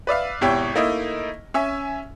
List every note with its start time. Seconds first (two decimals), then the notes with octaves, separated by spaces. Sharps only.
0.07 B4 D5 E5 F5
0.41 G#1 B2 E4 G4 C#5 G5
0.75 A3 A#3 D#4 E4 D#5
1.54 C#4 E5 G#5